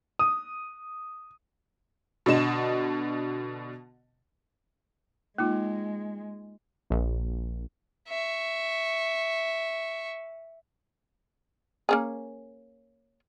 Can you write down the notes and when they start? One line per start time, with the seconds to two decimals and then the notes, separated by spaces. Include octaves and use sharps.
0.19 D#6
2.26 B2 D3 D#5 E7
5.38 G#3 A#3 D#4 F4
6.90 A#1
8.09 E5 C#6
11.89 A#3 C#4 G#4